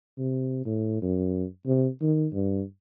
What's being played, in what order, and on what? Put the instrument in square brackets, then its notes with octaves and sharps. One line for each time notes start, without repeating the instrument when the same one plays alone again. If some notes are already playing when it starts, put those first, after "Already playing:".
[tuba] C3
A2
F#2
C3
D#3
G2